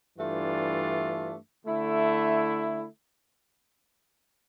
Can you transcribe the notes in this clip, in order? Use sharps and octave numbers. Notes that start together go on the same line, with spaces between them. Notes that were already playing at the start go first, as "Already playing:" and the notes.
G2 E3 A3 D4 F4
D3 A3 E4